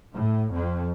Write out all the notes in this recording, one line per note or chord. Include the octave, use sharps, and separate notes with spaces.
A2
F2